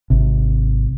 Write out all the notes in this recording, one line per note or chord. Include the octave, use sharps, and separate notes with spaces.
G#1 C3